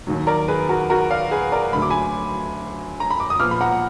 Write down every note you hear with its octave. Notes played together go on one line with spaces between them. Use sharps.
D#2 D#3 F#3
A#4 D5
G#4 B4
F#4 A#4
F#4 A#4
D5 F5
G#4 B4
A#4 D5
D2 D3 F#3 B5
D6
G#5 B5
A#5
B5
D6
D#6
A#2 F3 B3 D6 F6
B5
F#5 A#5